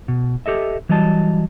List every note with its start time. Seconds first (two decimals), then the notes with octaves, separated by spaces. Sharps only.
0.08 B2
0.46 G4 A4 D#5 E5
0.89 E3 F#3 G3 D#5 A5